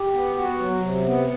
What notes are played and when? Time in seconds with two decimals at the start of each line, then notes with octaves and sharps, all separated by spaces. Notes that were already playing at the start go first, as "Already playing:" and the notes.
Already playing: G4
0.13 B3
0.36 F#4
0.59 F#3
0.81 C3
1.05 B3